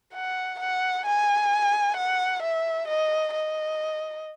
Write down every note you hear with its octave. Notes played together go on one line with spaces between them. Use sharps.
F#5
F#5
G#5
F#5
E5
D#5
D#5